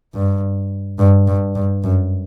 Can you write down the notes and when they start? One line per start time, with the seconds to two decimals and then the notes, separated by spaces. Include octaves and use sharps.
0.14 G2
0.99 G2
1.27 G2
1.55 G2
1.83 F#2